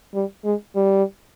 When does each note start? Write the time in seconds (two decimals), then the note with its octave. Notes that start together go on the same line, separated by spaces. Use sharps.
0.14 G3
0.45 G#3
0.76 G3